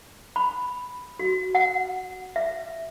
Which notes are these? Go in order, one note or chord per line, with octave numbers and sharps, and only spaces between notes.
B5
F#4
F#5
E5